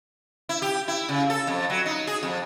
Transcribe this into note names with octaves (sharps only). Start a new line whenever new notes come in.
E4
G4
E4
C#3
A4
F2
F#3
D#4
G#4
F2